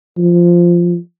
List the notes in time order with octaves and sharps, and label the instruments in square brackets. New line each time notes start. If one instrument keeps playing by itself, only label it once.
[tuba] F3